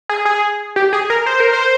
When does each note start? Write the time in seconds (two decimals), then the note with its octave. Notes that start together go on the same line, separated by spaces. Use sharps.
0.09 G#4
0.25 G#4
0.76 G4
0.93 G#4
1.10 A#4
1.26 C5
1.40 A#4
1.53 C5